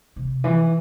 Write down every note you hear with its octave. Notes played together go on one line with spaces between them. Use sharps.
C3
E3